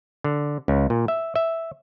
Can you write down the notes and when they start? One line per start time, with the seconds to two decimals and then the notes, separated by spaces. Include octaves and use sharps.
0.24 D3
0.68 C#2
0.90 A#2
1.08 E5
1.36 E5